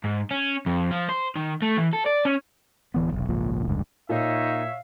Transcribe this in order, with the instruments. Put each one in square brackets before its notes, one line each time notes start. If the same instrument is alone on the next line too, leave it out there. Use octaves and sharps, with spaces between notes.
[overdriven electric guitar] G#2
C#4
F2
F3
C5
D#3
A3
E3
A4
D5
C#4
[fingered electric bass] D1 E3 B3
F1 B1
G#1 C#2 A#2 F3
F1 C#2 G2
[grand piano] A#2 [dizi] D#4 [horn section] C#5 E5 [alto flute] F5